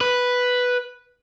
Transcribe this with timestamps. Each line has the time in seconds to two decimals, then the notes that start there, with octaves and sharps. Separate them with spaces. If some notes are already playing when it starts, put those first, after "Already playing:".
0.01 B4